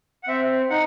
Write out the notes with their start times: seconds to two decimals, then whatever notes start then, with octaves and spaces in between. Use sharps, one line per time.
0.23 F#5
0.28 C4 E5
0.70 D#4 F#5